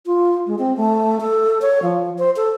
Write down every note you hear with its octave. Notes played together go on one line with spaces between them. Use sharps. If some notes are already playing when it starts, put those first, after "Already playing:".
F4
G#3
C4
A3
A4
C#5
F3
C5
A4